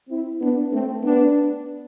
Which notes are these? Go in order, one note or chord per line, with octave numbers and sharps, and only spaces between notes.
C4 E4
B3 D4
A3 C4
B3 D4